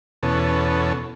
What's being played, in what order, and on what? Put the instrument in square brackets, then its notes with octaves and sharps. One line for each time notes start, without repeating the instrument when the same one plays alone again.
[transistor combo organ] E2 B2 C#4 A4